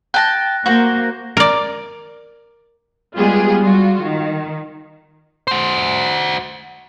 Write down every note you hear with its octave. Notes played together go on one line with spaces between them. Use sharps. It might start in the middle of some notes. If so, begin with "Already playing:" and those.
G5 A5 F#6 A#6
A#3 F#4 C5
A#4 D5
G3 G#3 B3 F4 G4 G#4
G3 F4 F#4
D#3
F#4 C5